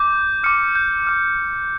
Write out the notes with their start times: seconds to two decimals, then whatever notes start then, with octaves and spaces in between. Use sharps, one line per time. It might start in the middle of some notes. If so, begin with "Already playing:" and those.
Already playing: D6 G6
0.44 D6 F6 C#7
0.75 G6
1.07 D6 F6